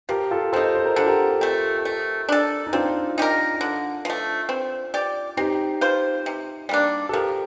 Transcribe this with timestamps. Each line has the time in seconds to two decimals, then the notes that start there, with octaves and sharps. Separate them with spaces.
0.09 F3 G4 A#4
0.31 F4 A4
0.53 C4 D#4 A4 C5
0.75 C5
0.86 A#4
0.96 D3 A4
1.06 G4 A#4
1.41 A3 C4
1.85 A3
2.29 D4 A4
2.66 D#4
2.73 C4 D4 F4
3.18 D#4 G4 A#4
3.61 D3
4.05 F3 A3
4.49 C4
4.94 G4 D5
5.37 C4 D#4 G4
5.81 F4 C5
6.26 C3
6.69 G3 A#3 D4
7.09 A4
7.13 F3 G4 A#4